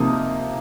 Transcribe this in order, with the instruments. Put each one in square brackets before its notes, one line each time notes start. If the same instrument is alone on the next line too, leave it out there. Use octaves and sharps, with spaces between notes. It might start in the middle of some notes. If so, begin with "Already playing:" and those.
Already playing: [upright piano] C3 F3 A#3 D#4 D#6